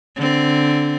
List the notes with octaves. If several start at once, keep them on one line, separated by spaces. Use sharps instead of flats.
D3 C4